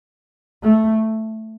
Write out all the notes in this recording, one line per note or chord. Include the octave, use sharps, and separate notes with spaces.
A3